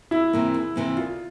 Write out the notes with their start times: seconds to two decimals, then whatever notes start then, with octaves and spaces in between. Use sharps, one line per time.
0.11 E2 E4
0.33 C3 E3 A#3
0.54 E2
0.76 C3 E3 A#3
0.97 D2 F4